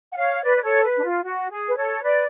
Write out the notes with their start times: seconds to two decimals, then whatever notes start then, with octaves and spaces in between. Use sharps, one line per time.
0.12 F#5
0.17 C#5 F5
0.43 B4 D5
0.57 D5
0.63 A4 C#5
0.84 B4
0.98 D4
1.04 F4
1.23 F#4
1.51 G#4
1.67 B4
1.76 A4 C#5
2.03 B4 D5